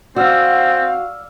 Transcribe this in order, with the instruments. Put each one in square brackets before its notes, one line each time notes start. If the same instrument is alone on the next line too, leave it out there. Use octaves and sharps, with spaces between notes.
[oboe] C4 [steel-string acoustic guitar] F#4 [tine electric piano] D5 E6 F6 [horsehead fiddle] F5